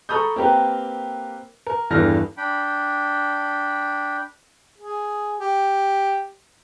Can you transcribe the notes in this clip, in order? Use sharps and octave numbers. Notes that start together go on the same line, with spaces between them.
A4 A#5 B5 C#6 D#6 G6
A#3 C4 G4 A#4 B4
A#4
E2 G2 E3 A4 F6 A#6
D4 G5 B5
G#4
G4